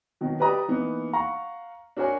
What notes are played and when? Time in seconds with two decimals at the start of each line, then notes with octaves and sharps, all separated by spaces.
0.21 B2 D#3 F#3
0.40 G4 B4 D5 D#5 A#5 D#6
0.68 E3 A#3 B3 D#4
1.13 F5 F#5 A#5 C#6
1.97 D4 F#4 A#4 C#5 G#5 C#6